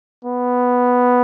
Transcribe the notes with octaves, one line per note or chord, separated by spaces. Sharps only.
B3